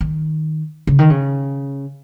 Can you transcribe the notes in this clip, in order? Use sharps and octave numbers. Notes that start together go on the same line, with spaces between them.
D#3
C#3
D#3
C#3